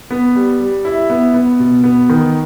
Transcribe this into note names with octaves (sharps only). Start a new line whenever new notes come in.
B3
G3
G3
E4
B3
B3
B2
B3
D#3